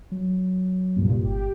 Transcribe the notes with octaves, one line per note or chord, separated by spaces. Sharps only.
F#3
C2 G2 A#2
G1 G4